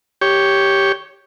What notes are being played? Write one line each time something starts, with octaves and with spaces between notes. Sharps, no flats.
G4 C#5